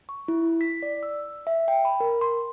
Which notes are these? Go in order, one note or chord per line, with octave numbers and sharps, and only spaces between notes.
C#6
E4
B6
D5
E6
E5
G5
B5
A#4
C6